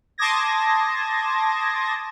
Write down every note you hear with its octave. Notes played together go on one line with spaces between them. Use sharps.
A5 C6 D6 D#6 G#6 A#6